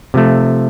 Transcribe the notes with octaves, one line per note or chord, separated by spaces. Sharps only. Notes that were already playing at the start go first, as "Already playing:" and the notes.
C3 F3 A3